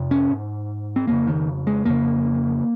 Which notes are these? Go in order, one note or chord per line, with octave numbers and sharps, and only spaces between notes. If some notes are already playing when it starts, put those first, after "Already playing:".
Already playing: F2 C3
C#4
G#2
C4
F2 C#3 A#3
D#3
G#3
F2 C#3 A#3